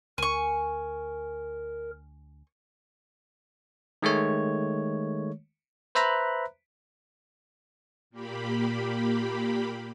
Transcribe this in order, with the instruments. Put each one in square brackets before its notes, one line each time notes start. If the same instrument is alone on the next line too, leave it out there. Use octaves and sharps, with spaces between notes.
[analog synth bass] D2 [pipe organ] A#4 [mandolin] G#5 C#6
[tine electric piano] D#3 G#3 A3 C#5
B4 C5 E5 A#5 B5 F#6
[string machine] A#2 A#3 G4 B5